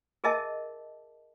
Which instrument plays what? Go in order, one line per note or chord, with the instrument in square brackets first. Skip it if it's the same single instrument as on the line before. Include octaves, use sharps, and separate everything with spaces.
[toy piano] G#4 A#4 D#5 E5 A5